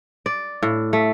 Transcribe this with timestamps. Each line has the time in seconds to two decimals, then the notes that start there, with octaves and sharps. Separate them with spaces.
0.26 D5
0.63 A2
0.93 A3